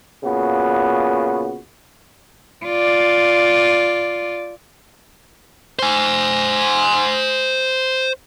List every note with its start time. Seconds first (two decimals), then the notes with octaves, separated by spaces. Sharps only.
0.23 A#2 C#3 B3 F#4
2.66 F4 D5
5.79 C5 G#5